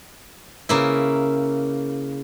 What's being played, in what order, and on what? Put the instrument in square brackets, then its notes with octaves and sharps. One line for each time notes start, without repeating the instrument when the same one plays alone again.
[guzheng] C#3 A#3 E4